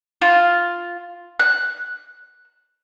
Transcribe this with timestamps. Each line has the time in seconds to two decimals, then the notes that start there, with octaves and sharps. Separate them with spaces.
0.22 F4
1.39 F#6